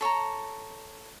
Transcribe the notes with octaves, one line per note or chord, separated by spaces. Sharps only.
A4 C#5 A5 A#5